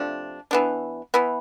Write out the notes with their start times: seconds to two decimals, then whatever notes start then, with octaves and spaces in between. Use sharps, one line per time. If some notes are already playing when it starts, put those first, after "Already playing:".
Already playing: C3 F3 A3 D4
0.51 E3 B3 D4
1.14 E3 B3 E4